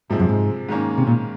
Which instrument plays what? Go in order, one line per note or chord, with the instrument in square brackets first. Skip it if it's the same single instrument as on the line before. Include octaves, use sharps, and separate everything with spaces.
[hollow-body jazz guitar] G#2 [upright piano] C3 F3 G#3 C4
[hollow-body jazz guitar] F#2
G#2
[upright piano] G#2 D#3 A#3 C#4
[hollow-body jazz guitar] C3
A#2